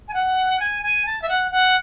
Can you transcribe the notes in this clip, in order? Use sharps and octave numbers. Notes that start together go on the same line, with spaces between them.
G#5
F#5
G#5
G#5
A5
E5
F#5
F#5